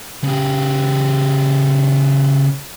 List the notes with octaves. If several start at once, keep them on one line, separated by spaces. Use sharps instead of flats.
C#3 G4